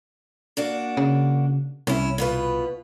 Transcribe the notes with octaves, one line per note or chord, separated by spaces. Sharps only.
A#3 D4 F#4
C#3
C2 C#4 E4
B2 F4 B4